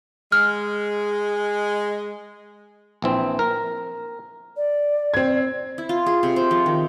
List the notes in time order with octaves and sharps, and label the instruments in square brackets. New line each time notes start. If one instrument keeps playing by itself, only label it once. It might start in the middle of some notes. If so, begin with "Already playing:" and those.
[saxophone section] G#3 [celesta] F6
[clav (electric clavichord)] A#1 E3 C4
A#4
[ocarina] D5
[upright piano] C4 G#6
[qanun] E4
F4
G#4
C3
C5
F3
D#3